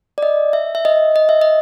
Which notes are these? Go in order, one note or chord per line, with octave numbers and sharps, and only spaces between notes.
D5
D#5
E5
E5
D#5
D#5
E5
D#5